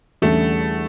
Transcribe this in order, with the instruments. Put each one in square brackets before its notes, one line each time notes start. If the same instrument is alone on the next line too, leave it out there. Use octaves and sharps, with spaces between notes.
[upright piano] E2 D3 G3 C#4 [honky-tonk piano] A3